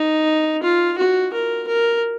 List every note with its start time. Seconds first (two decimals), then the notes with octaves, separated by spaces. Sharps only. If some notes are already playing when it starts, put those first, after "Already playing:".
Already playing: D#4
0.63 F4
0.98 F#4
1.33 A#4
1.68 A#4